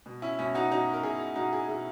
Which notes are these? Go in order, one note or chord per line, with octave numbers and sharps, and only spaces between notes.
B2
C#4 E4
B2 C#4 E4
D#4 F#4
B2 D#4 F#4
A#4
B2 E4 G#4
B2 D#4 F#4
E4 G#4
B2 E4 G#4